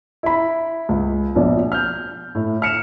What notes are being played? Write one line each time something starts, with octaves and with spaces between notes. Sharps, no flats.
E4 B5
C#2
A#1 B2 D5
F6 G6
A2
F6 C#7 E7